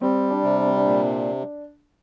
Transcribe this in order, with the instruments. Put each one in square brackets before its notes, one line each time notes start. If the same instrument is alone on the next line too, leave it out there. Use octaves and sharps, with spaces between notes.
[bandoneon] G3 [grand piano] C4
[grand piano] D4
[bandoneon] C3
[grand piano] D4
C4
D4
[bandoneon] A#2